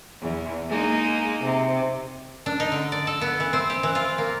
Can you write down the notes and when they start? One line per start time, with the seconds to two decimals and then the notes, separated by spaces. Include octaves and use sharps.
0.21 E2
0.69 G#3 A#3 D#4
1.44 C3
2.46 D4
2.60 D#4
2.72 D3
2.92 D5
3.07 A4
3.21 B3
3.40 E3
3.53 C4
3.70 G4
3.83 E3
3.95 F4
4.18 A#3